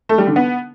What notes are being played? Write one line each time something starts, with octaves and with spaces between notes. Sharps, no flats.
A3
G3
D3
B3